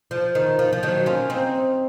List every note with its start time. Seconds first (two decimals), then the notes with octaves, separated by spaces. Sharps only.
0.11 F3
0.35 D#3
0.59 F3
0.73 F3
0.83 D#3 F#3
1.06 C#4 F4
1.30 C4 D#4